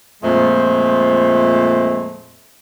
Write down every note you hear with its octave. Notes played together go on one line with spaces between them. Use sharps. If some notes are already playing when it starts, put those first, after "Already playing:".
F2 A#2 G#3 A3 C5